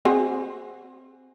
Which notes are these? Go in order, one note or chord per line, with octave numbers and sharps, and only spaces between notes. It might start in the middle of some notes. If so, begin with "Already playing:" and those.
C4 F#4 G#4